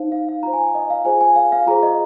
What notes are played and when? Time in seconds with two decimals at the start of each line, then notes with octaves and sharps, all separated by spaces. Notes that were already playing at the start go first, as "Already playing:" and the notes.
Already playing: D#4 C5 F5
0.12 F5
0.29 F5
0.43 F4 C5 A#5
0.53 G#5
0.63 F5
0.75 D#5
0.90 F5
1.05 F4 G#4 C5 G#5
1.21 G#5
1.36 F5
1.52 F5
1.66 F4 G#4 C5 A#5
1.83 D#5